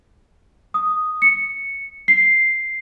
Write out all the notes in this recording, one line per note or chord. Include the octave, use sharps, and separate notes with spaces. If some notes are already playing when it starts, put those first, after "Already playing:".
D#6
C#7
C7